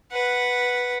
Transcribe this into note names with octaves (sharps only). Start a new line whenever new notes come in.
B4 F#5